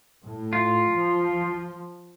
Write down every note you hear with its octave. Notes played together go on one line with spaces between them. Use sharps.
A2
F4
F3